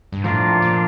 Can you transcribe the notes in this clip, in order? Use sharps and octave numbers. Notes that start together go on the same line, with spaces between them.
G2
A2 F3 A#3 D4 F4
A#2